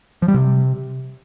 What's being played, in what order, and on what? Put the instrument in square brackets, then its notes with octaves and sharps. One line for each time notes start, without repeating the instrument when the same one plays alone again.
[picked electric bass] F3
G3
C3